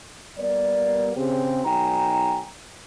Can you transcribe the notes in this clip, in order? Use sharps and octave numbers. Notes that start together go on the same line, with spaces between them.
G3 A#3 B3 A#4 D5
C#3 C4 G4
B1 D#4 G5 G#5 A#5